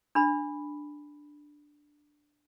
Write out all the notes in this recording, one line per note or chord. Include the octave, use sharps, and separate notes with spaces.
D4 B5